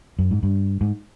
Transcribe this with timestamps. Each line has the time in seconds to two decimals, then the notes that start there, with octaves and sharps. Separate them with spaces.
0.19 F#2
0.31 G#2
0.43 G2
0.81 G#2